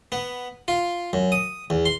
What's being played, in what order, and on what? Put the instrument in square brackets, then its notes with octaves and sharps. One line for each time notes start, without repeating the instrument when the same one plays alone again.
[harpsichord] B3
F4
F#2
D#6
E2
C6